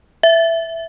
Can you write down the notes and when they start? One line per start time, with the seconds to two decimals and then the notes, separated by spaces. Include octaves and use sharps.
0.23 E5